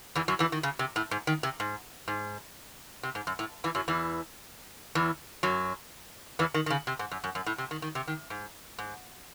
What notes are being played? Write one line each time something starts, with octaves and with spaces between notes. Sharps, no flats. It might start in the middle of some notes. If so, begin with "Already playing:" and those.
E2 E3
F#2 F#3
E2 E3
D#3
C#3
C3
A2
G#2
D#3
C3
G#2
G#2
C3
G#2
F#2
A2
E2 E3
F#2 F#3
E2 E3
E2 E3
F#2 F#3
E2 E3
D#3
D#3
C#3
C3
G#2
F#2
F#2
F#2
A2
C3
D#3
D#3
C3
D#3
G#2
G#2